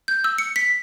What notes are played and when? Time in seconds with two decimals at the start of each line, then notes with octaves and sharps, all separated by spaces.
0.08 G6
0.24 E6
0.38 C#7
0.56 B6